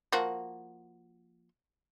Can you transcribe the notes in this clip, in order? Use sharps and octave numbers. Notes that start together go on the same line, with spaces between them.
F3 A#3 F#4